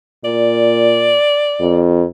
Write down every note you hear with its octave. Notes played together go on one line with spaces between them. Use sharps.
A#2 D5
F2